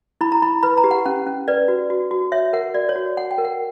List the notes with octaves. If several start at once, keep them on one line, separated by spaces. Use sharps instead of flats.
E4 B5
A#5
E4 B5
B4 B5
A#5
G4
F#5
C#4 F#5
C#4
B4 D5
F#4
F#4
F#4
C#5 E5
A#4 F#5
F#4 D5
C#5
F#4
C#5 F#5
G5
A#4
F#5